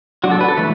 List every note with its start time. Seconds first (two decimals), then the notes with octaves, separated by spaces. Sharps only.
0.24 F#3 D4 F#4
0.31 A4
0.41 B4
0.48 A4
0.57 E3 A3 B4